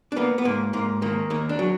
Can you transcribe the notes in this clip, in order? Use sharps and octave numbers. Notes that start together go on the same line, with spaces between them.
D4
A#3 B3
B3
G#2 A#3
G#2 A#3
D#3 A#3
D#2 A#3
D4
F#3